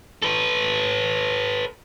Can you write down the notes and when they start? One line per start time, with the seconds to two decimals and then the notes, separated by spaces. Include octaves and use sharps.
0.22 A4 B4